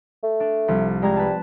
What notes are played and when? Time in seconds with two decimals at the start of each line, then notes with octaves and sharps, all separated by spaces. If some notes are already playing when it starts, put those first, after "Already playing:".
0.24 A3
0.40 D4
0.68 C2 F3
1.02 G3 G#3 A#5 G#6
1.17 B4 A5